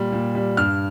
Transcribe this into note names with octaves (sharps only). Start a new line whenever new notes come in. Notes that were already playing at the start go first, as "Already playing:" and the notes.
Already playing: A#2 G3
A#2
G3
G2 F6